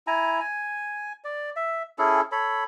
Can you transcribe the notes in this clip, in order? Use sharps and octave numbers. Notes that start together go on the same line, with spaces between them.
E4 G#5 A#5
G#5
D5
E5
C#4 E4 G#4 A4
A4 C#5 B5